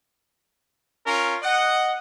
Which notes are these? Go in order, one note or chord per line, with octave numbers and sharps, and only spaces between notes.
C#4 F4 A#4
D#5 F#5